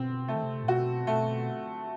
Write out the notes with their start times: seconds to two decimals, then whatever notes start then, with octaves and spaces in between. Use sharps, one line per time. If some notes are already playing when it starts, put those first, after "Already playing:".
Already playing: B2 C4
0.28 C3 A3
0.35 D#3
0.43 C3
0.63 A2
0.68 B2 F#4
1.07 B2 A3